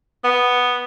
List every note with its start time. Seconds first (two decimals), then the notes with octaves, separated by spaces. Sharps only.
0.24 B3